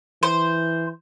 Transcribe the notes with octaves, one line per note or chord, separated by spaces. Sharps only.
E3 C5